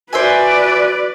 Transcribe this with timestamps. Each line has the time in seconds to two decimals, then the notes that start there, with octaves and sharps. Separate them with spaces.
0.13 F#4 B4 C5 D5 E5 G#5